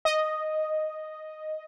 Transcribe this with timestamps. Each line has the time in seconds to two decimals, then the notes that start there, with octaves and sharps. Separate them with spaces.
0.05 D#5